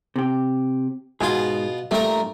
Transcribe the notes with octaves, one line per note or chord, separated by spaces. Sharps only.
C3 G4
G#2 B2 F4 G#4
G2 A#2 G3 A3 A#4